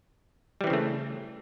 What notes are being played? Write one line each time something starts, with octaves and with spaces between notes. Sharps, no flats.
C#3 E3 G3 A3 C4